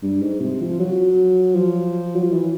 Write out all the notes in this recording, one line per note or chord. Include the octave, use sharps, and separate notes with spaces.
G2
G#2
C3
F3
F#3
F3
F#3
F3
E3